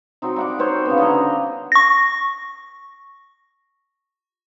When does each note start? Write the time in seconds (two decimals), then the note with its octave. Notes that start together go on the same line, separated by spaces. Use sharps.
0.22 F#3 C4 D#4
0.36 G3 F#5 D6
0.59 C4 D#4 C5 C#5
0.85 C#3 B3
0.98 D3 D#5 A#5
1.17 G4
1.72 C#6 A#6